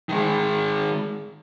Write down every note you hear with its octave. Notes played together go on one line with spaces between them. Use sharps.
D#3 G#3